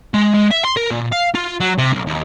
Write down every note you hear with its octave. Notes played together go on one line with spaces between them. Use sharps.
G#3
G#3
E5
C6
A#4
A#2
F5
F4
F#3
C3
B1
D#2